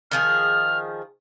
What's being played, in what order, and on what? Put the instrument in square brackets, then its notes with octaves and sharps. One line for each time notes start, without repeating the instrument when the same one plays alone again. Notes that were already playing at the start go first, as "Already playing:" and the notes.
[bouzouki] D#3 F3 G#4 [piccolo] F6